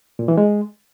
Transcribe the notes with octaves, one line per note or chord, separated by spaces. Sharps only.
A#2
E3
G#3